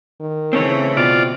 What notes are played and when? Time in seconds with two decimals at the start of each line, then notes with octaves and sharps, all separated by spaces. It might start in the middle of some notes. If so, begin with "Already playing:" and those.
0.20 D#3
0.53 C#3 E3 A3 C4 C#4 C#5
0.97 B2 C4 F4 D5